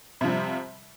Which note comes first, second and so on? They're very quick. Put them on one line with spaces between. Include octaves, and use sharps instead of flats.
C3 F3 G3